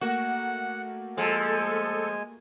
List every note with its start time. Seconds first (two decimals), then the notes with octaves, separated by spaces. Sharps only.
0.01 A3 A#3 F#4 A#4 F#5
1.17 F3 G#3 A4 G#5